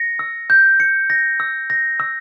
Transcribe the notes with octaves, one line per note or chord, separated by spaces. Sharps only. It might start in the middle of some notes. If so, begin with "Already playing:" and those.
Already playing: A#6 C#7
E6
G6
C#7
A#6
E6
A#6
E6